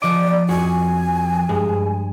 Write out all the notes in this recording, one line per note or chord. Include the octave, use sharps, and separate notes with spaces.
F3 D5 D#5 D6
F2 F#4 G#5
G2 G#3